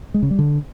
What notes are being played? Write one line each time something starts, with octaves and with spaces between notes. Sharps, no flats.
G#3
C#3
G3
D3